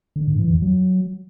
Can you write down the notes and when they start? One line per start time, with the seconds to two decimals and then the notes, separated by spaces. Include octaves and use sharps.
0.16 D3
0.27 G#2
0.39 E3
0.50 F2
0.62 F#3